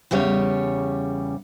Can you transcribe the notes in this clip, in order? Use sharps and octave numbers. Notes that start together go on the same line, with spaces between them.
E2 C#3 G3 C#5